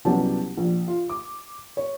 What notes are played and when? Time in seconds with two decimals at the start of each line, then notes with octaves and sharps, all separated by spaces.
0.05 C2 F#3 B3 C#4 G4 A5
0.57 A#1
0.88 F4
1.09 D6
1.77 C#5